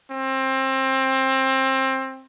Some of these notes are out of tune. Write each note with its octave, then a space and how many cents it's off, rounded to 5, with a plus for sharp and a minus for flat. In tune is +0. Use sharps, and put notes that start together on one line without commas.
C4 +25